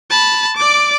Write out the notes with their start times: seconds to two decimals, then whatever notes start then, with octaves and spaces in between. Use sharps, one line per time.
0.10 A5 B5
0.57 D5 D6